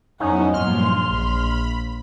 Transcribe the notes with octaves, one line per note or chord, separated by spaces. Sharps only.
F2 F#3 B3 C#4 D#4 E4 F#5
G2 A#2 F3 F#3 C6 F6
A#1 B5